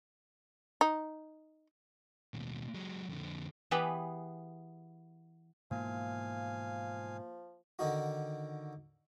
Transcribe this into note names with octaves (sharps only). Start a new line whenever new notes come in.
D#4
D#2 B2
F#3 G#3
F2 D3
E3 B3 G4 G#4 B4
G#2 B2 E3 F3 A#3 F5 G#5
D3 D#3 D#4 F#4